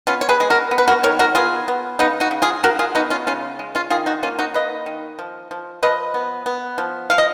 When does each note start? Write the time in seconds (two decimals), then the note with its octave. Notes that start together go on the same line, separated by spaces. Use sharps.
0.07 B3 C#4 F4
0.21 C#5
0.29 G#4 B4
0.40 G#3 G#4
0.50 F#4 A#4
0.71 B3
0.78 B4
0.88 F#4 A#4
1.03 D#3 A#4 C#5
1.19 F#4 A#4
1.35 B3 F4 G#4
1.68 B3
1.99 C#3 B3 D#4
2.20 D#4 F#4
2.31 C#3
2.42 F4 G#4
2.63 C#3 F#4 A#4
2.79 F4 G#4
2.95 B3 D#4 F#4
3.10 C#4 F4
3.27 C#3 C#4 F4
3.59 G#3
3.75 C#4 F4
3.90 D#3 F4 G#4
4.06 D#4 F#4
4.23 A#3 C#4 F4
4.39 D#4 F#4
4.54 A#3 B4 D#5
4.86 D#3
5.19 F3
5.51 F3
5.83 F3 B4 D#5
6.14 B3
6.46 B3
6.78 F3
7.10 F3 F5
7.18 D#5